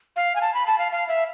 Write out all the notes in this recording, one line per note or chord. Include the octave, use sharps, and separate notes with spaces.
F5
G#5
A5
B5
A5
F5
F5
E5